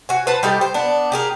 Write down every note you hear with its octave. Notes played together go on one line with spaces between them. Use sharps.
F#4 G#5
B4 C5 A5
G3 D#4 G4 A4
C5
B3 D4
G4 G#4 A#4